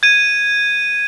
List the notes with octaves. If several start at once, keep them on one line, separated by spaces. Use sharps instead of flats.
G#6 D#7